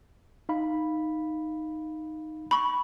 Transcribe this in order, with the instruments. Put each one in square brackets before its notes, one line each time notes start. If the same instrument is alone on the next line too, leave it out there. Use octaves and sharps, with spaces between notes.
[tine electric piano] D#4 F5 B5
[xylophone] B5 C#6